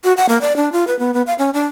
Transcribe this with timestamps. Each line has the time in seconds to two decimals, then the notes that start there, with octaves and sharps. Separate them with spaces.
0.04 F#4
0.17 F#5
0.29 A#3
0.41 D5
0.56 D4
0.72 F4
0.87 B4
0.99 B3
1.14 B3
1.27 F5
1.39 C#4
1.54 D4